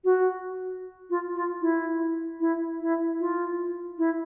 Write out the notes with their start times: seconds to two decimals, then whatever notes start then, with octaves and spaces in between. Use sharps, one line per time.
0.04 F#4
1.10 F4
1.35 F4
1.62 E4
2.40 E4
2.81 E4
3.20 F4
3.98 E4